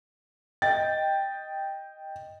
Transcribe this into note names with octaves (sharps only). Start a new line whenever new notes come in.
D#5 G5 A6